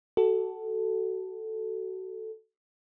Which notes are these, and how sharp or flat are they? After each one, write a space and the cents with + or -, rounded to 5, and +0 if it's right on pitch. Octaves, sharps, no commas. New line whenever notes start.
F#4 +25 A4 +0